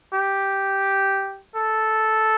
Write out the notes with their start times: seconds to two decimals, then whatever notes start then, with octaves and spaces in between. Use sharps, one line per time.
0.13 G4
1.55 A4